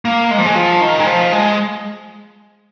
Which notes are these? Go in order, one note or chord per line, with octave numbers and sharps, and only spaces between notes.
A#3
G#3
F3
G#3
F3
D#3
G#3
F3
G#3